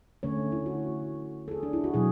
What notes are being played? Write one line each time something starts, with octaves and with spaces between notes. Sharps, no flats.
D3 A3 C#4 C#5
E4
F#4
A4
G#4
D4
E4
F#4
B2 F#3 G#4